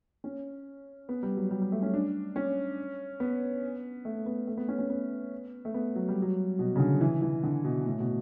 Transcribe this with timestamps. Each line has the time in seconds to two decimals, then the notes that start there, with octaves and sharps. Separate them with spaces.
0.24 C#4
1.09 B3
1.23 G3
1.37 F#3
1.51 G3
1.62 G3
1.72 A3
1.82 C#4
1.94 D4
2.36 C#4
3.20 B3
4.05 A3
4.26 B3
4.47 A3
4.57 B3
4.68 C#4
4.79 C#4
4.90 B3
5.65 A3
5.74 B3
5.96 F#3
6.08 G3
6.22 F#3
6.59 B2
6.76 C#3
6.80 D3
7.01 E3
7.22 E3
7.43 D3
7.64 B2
7.86 A2
8.00 B2